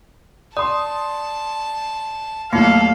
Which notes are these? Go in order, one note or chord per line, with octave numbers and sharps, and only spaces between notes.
D5 A5 C6 D#6
D#2 A2 F#3 A3 B3 A4 F5 C#7